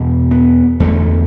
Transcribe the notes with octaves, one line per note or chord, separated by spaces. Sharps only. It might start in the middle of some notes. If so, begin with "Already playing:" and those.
Already playing: E2 B2
B3
E2 D3 A3